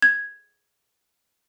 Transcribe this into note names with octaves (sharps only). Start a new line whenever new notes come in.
G#6